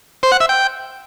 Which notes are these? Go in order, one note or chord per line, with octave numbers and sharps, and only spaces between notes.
C5
F#5
E5
G5